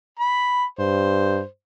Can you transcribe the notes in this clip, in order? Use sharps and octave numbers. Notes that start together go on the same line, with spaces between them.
B5
G2 C5